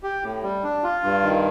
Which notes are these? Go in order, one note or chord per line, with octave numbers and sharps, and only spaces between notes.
G4
A2
G3
D4
F4
G2
D#3